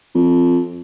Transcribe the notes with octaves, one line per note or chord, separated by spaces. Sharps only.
F2